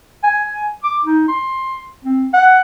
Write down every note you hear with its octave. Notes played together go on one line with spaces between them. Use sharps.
G#5
D6
D#4
C6
C4
F#5